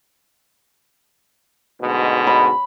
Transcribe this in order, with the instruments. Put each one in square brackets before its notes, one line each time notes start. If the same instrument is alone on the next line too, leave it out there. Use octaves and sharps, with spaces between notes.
[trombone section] D2 G#2 B2
[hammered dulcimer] B5